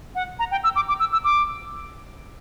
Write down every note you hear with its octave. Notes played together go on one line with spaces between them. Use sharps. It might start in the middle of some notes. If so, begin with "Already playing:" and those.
F#5
A#5
G5
E6
D6
D6
E6
E6
D6